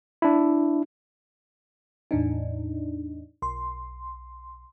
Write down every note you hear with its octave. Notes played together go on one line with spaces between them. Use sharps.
D4 E4
E2 A2 D4 D#4
B1 C6